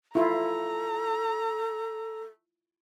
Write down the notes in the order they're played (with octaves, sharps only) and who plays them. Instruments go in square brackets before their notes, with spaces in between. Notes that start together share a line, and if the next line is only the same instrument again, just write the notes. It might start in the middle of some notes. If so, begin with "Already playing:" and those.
[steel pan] E4 F4 [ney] A4 [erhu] A#5